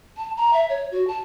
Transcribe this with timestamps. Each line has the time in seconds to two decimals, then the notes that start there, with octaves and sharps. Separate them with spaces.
0.17 A5
0.37 A#5
0.53 E5
0.69 C#5
0.92 F#4
1.08 A5